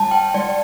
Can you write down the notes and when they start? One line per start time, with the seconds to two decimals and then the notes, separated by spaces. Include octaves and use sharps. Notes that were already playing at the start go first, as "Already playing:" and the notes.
Already playing: G3 A5
0.11 G5
0.34 G3 D5